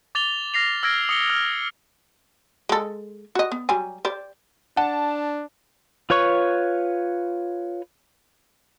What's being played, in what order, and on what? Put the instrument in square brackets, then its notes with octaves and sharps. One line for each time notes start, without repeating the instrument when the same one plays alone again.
[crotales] D6 A6 F7 G7
F6 A#6 C7 F7
E6 F6 G#6 A#6 D7
D#6 C#7 G7
F6
[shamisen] G#3 A4
F#4 D#5
B3
F#3 G3 G#5
G4 C5 D5
[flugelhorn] D4 [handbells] F#5 [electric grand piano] A5
[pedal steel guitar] F4 B4 C#5 C#6